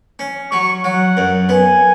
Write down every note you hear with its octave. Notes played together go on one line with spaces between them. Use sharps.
C#4
F#3 C#6
F#3 F#5
F#2
B3 G#5